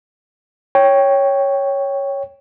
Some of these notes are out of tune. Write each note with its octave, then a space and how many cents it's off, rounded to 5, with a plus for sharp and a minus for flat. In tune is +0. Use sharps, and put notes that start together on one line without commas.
C#5 +0 G5 +0